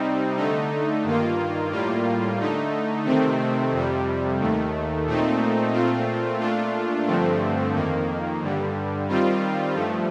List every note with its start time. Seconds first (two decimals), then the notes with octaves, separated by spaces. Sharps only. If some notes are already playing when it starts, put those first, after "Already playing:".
Already playing: C3 G3 C4 D#4
0.37 D3 A3 D#4
1.04 G2 D#3 A#3 F4
1.71 A2 G3 A#3 F4
2.38 D3 A3 D#4
3.05 C3 D#3 A3 C4
3.72 F2 C3 G3
4.39 D#2 D#3 A3
5.06 A#2 A3 C4 D#4
5.73 A#2 A3 C4 F4
6.40 A#2 A3 D4 F4
7.07 G2 D3 F3 A3 C4
7.74 F2 D#3 A#3
8.42 G2 D3 G3
9.08 D#3 G3 C4 F4
9.75 G2 F3 A3